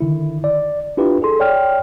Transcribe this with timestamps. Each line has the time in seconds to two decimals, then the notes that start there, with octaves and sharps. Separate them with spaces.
0.01 D3 D#3 E4
0.44 D5
0.97 D4 E4 F4 G4 B4
1.22 G#4 A4 C6
1.40 C#5 D5 G5 F6